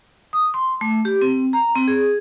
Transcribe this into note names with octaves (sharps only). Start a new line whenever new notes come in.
D#6
C6
A3
G4
C4
A#5
C4
G#4